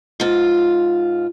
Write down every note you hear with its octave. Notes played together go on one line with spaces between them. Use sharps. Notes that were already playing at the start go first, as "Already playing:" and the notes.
G#2 F4